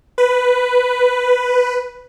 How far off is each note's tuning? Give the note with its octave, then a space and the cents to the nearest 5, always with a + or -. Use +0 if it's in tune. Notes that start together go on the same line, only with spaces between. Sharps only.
B4 +5